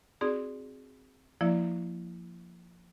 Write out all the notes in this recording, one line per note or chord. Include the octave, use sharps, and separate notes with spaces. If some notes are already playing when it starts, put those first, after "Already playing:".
C4 D#4 F#4 G#4 D5
F3 A#3 E4 D5 E5